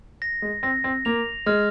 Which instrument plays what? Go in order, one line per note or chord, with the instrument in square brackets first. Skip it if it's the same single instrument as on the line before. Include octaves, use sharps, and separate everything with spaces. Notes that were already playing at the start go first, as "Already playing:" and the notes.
[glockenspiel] A#6
[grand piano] G#3
[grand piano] C4 [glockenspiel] A#6
[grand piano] C4
[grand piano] A#3 [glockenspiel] F7
[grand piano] G#3 [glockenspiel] F6